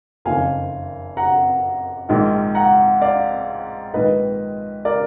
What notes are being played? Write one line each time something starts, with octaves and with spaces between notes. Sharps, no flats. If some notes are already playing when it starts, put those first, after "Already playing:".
F#1 F2 D#3 F5 G#5
F#5 A#5
A#1 G#2 D#3
F#5 A#5
D5 F5
A#1 G#2 D#3 B4 D#5
A#4 D5